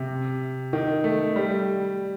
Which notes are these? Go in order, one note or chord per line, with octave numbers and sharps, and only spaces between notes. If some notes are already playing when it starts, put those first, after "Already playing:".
Already playing: C3
D#3
A3
G3